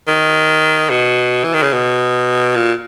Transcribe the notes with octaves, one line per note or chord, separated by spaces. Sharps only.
D#3
B2
E3
D#3
C#3
B2
A#2